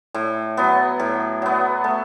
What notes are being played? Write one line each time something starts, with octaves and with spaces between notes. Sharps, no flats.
A2
F#3 B3
A2
F#3 B3
A3